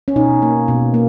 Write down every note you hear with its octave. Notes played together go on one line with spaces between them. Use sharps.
C#4
B2 D#4
A#3
B2
A#3